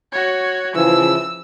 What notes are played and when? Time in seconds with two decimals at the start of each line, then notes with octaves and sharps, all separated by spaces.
0.12 F#4 C#5
0.75 C#3 E3 F3 E6